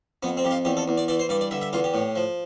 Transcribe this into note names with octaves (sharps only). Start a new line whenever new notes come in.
F2 B3
C4
F2 G4
F4
E2 G4
A4
E2
D5
E3 D5
C5
G2 D5
D5
D3 E5
E5
E2 F4
G4
A2
F3